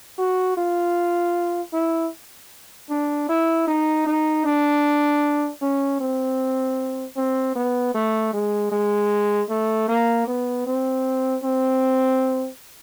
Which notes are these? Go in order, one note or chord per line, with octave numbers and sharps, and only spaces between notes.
F#4
F4
E4
D4
E4
D#4
D#4
D4
C#4
C4
C4
B3
A3
G#3
G#3
A3
A#3
B3
C4
C4